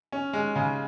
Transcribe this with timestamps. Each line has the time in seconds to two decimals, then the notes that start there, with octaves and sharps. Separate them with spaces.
0.12 C#4
0.33 G#3
0.55 C#3